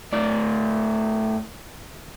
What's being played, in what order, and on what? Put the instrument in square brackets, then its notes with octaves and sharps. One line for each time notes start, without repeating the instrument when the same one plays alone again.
[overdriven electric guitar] A2 D5